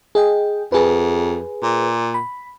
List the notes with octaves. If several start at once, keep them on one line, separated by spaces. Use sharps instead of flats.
G#4 D#5 G5
F2 G#4 B4
A#2
B5